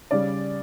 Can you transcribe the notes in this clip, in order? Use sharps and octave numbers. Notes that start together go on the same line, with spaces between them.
C#3 G3 D5